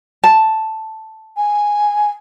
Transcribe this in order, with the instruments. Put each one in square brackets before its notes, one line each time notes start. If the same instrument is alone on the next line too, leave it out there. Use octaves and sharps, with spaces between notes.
[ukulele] A5
[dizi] G#5